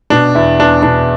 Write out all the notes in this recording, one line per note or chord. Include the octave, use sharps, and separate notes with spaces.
B2 D4
E2 E4
E2 D4
B2 D4